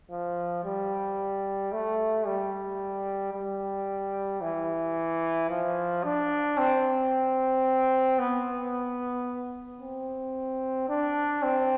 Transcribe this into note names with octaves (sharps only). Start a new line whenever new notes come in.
F3
G3
A3
G3
G3
E3
F3
D4
C4
B3
C4
D4
C4